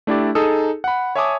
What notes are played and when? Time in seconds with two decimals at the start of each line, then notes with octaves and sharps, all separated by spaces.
0.07 A3 D4 E4 G4 D5
0.35 D#4 G#4 A4 D#6 E6
0.84 F#5 B5
1.16 C#5 E5 G#5 A5 D6 D#6